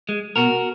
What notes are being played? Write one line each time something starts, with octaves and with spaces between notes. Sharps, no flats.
G#3
B2 F#4 A#4